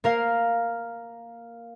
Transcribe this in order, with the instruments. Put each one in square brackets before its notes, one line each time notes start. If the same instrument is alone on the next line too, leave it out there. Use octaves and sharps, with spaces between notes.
[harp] A#3 A#4 F5